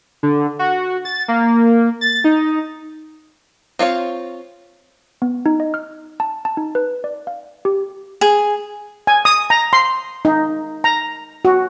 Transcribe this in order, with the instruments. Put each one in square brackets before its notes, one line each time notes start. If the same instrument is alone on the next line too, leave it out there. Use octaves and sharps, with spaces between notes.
[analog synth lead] D3
F#4
A6
A#3
A6
D#4
[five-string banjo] C4 F4 C#5 F5
[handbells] B3
D#4
D#5
F6
A5
A5
D#4
B4
D5
F5
G4
[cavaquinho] G#4
[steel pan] G#5
D#6
A#5
C6
D#4
A#5
F#4